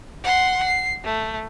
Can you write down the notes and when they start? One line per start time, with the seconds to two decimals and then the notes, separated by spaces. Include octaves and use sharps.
0.24 F#5 C6
0.63 C7
1.04 A3